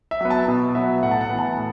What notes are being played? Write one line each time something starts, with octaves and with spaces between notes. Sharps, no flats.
E5
F#3 B3
A5
B2
F#3 B3 E5
A2 F#5
A5
F#5
E3 B3
A5
A2